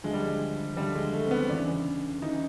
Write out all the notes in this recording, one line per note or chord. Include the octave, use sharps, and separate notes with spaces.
D2 D3 F3 G#3
G3
G#3
D2 D3 F3 G3
G#3
A3
C4
B3
E2 C#3 E3 D4
C#3 E3 D#4